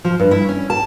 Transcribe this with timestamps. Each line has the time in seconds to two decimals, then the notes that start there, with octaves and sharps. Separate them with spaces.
0.05 F3
0.20 G2
0.31 E4
0.49 C#4
0.70 A5